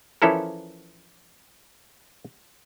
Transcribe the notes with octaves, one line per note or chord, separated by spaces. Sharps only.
E3 F3 C#4 E4 A4 A#4